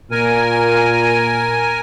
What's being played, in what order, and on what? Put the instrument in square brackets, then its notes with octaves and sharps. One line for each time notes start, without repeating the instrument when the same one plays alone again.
[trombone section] A#2 [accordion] A#4 G#5